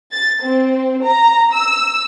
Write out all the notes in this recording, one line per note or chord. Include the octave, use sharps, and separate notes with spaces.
A6
C4
A#5
E6